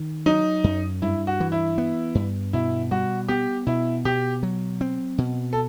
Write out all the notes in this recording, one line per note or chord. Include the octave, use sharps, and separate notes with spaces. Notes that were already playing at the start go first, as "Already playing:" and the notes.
Already playing: D#3
F#3 D#4
F#2
G2 E4
F#4
E3
E4
B3
G2
B2 E4
G3 F#4
B3 G4
B2 E4
B2 G4
F#3
C4
B2
A4